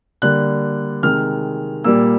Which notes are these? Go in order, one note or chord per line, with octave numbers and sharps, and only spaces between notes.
D3 G3 A#3 F#6
C3 D#3 G#3 F6
A#2 G3 A#3 E6